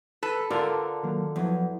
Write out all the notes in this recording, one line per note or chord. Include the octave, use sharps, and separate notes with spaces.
A4 B4
D3 F4 A#4 D5 F5
D#3 F#3 A#3
E2 F3 F#3